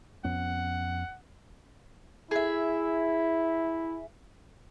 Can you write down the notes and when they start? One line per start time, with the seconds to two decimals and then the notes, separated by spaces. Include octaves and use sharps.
0.25 F2 B3 C#4 F#5
2.31 E4 G#4 E5